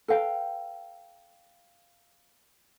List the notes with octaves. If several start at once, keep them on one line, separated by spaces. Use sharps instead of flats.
A4 B4 F5 G5